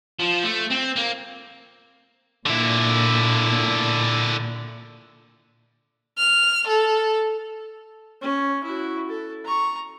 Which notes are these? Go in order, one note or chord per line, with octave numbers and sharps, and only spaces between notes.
F3
A3
C4
A#3
A#2 D3 E4
F6
A4
C#4
E4 F#4
A4
A#5 C#6